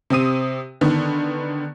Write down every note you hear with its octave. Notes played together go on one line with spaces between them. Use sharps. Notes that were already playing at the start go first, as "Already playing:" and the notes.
C3 C4 D#6 D#7
D3 D#3 B3